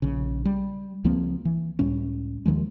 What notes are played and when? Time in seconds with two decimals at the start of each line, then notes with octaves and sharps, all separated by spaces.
0.02 A#1 C#3
0.45 G3
1.04 C#2 F3 A#3 C4
1.45 E3
1.79 C#2 A2 G3 C#4
2.46 D#2 D#3 F3 G#3